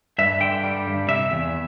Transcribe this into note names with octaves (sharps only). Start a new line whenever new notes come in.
G2 E5
D3 G5
G3
G2
C3 E5
E2